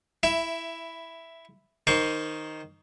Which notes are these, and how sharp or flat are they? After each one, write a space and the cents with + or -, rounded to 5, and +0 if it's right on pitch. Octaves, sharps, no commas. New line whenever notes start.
E4 +0 E5 +20
D#3 +0 C5 +5 C#6 +40